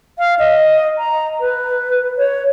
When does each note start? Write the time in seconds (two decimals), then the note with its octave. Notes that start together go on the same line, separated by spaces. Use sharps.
0.19 F5
0.39 D#5
0.98 A#5
1.40 B4
2.17 C#5